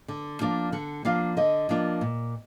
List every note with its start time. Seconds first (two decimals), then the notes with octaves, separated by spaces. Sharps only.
0.08 D3
0.41 F3 A#3 D4 F4
0.72 D3 F#5
1.05 F3 A#3 D4 F4 F5
1.37 D3 D#5
1.69 F3 A#3 D4 F4
2.01 A#2